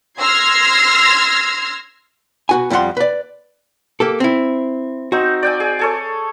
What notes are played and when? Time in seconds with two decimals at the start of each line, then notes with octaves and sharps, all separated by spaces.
0.20 C6 E6 F6 G#6 A#6 C7
2.49 B2 F#4 G#5
2.70 F2 F3 G3 D#4 F#5 C6
2.97 B4 D5
4.00 A#3 G4 A4
4.20 C4 E4
5.12 C4 D#4 F#4
5.43 D5 G5 G#5
5.60 G#4
5.79 G#4 A4 C#5